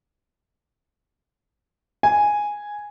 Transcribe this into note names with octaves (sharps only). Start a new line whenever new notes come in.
G#5